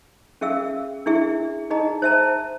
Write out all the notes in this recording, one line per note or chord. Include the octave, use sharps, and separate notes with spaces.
C#4 G#4 E5 F5 E6
D4 E4 G#4 E5
D#4 G#4 D#5 A#5
C5 E5 A5 A#5